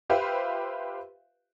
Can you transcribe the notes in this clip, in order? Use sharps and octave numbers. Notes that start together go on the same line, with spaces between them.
F4 G4 B4 C5 E5 F5